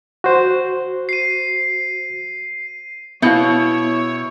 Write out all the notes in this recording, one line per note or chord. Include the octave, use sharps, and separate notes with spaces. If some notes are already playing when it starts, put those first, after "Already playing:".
F#4 C5
C7 D#7
B2 B3 E4 C#5 E5 F5